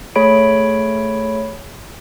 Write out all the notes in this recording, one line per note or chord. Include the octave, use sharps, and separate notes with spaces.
A3 G#4 C#5 B5 D7